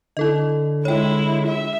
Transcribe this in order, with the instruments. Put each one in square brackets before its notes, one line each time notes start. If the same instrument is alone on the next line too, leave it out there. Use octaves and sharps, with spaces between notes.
[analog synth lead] D3 [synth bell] E4 A4 D#5
[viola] G#3 E4 [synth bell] C#5 G5
[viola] E5